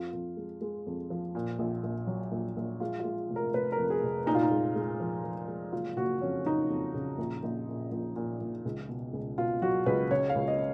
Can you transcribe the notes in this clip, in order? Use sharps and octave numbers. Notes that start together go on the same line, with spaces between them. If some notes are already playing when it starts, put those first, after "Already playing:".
Already playing: F2 F4
F2
G#3
G#3
F2
F3
A#2
A#1
A#1
F#3
A#1
A#1
G#3 F4
F4
G#3
F1
A#4
F1 B4
A#4
F2
G#4
F1
A#2 D#4
F4
D#4
G#3
G#3
F3
F3
G#3
F#1 F4
F#1 F#4
F2 C#4
F#1 D#4
F2
C#3
A#1
A#1
A#2
A#1
A#2
A#1
C#2
B2
C#2
B2 F4
F#3 F#4
C#2 B4
C#3 C#5
F5
C#2
D#5